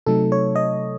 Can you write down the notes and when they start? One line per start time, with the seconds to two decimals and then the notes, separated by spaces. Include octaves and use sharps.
0.06 C3 F#3 A3 D#4 A4
0.32 C#5
0.56 D#5